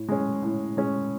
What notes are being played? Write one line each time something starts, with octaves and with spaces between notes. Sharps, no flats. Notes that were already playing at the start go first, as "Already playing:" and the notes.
Already playing: A2
G#3 C#4
A2
G#3 C#4